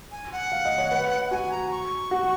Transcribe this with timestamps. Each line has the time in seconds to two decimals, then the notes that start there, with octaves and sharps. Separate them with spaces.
0.12 G#5
0.32 F#5
0.52 F5
0.65 D#5
0.78 C#5
0.91 B4
1.31 F#4 G#5
1.51 A#5
1.71 C#6
2.11 F#4